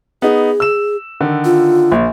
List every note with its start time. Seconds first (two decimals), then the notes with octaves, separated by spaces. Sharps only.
0.22 B3 D#4 G#4
0.60 E6 E7
1.21 D3 D#3
1.45 F4
1.92 A#1